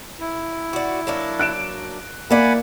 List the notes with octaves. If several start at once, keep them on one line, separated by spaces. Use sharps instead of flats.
E4
F#4 D5
F#3 A#3 D4
F#6 D7 E7
A#3 E4 D5 F#5 G#5 B5